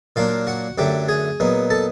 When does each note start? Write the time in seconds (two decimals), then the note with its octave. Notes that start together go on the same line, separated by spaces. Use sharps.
0.16 A#2 F#3 A#3 D4 F4 F5
0.47 F#4 F#5
0.78 F#2 D3 F#3 A3 G4 G5
1.08 G#4 G#5
1.40 A#2 F#3 B3 D#4
1.70 A4 A5